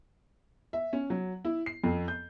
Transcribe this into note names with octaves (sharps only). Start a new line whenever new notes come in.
E5
C#4
F#3
E4
C7
F2
G6